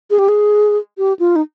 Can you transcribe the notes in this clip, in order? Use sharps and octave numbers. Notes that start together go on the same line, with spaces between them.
G#4
G4
G#4
G4
F4
D#4